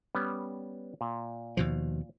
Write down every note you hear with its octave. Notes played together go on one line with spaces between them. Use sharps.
G3 B3 C#4
A#2
D#2 B2 F3